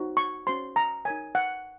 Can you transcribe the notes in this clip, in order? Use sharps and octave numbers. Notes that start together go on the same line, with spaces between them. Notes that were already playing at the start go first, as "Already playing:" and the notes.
Already playing: D#4 F#4 C5
C#6
C#4 F#4 C5 C6
A#5
D#4 A#4 C#5 G#5
F#5